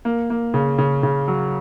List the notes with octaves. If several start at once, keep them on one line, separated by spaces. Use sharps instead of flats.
A#3
A#3
C#3
C#3
C#3
F#3